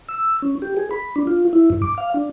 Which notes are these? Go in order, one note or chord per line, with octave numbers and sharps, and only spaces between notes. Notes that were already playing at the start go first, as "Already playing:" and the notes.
E6
C#4
G4
G#4
B5
D4
F4
E4
G2
D6
F5
D4